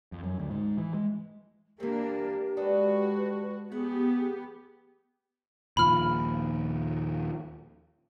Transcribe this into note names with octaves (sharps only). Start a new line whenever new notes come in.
F2
F#2
D2
G#2
E3
G#3
C3 E3 A#3 D4 G4 A#4
G#3 D4 F#4 A4 B4 D#5
A3 B3 G4 G#4 F#5
D#2 A#2 F3 B5 F6